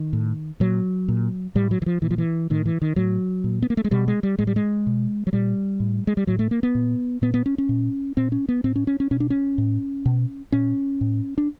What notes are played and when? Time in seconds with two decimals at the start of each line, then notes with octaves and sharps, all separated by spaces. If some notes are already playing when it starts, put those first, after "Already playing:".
Already playing: D#3
0.13 A2
0.60 A#2 F#3
1.08 A#2
1.55 A2 G3
1.71 F#3
1.82 E3
1.86 F3
2.02 A#2 E3
2.11 F3
2.18 E3
2.50 A2 D#3
2.66 E3
2.82 D#3
2.96 A2 F#3
3.44 A#2
3.62 B3
3.70 A#3
3.77 A3
3.84 G#3
3.91 B2 G3
4.08 G#3
4.23 G3
4.39 A2 G#3
4.47 G3
4.56 G#3
4.87 B2
5.27 F#3
5.33 A#2 G3
5.80 A2
6.07 G#3
6.17 G3
6.27 A2 F#3
6.39 A3
6.51 A#3
6.63 B3
6.75 A#2
7.22 A#2 B3
7.34 B3
7.46 C#4
7.58 C#4
7.69 A#2
8.17 A#2 C4
8.32 C#4
8.49 B3
8.64 A2 C4
8.76 C#4
8.87 C#4
9.00 C#4
9.11 B2 C#4
9.20 D4
9.30 C#4
9.58 A2
10.06 B2
10.52 A#2 C#4
11.01 A2
11.38 D4